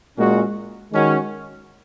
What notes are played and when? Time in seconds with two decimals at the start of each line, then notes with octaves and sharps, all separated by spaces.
0.16 A#2 G#3 C#4 F#4
0.90 D#3 G#3 C#4 F#4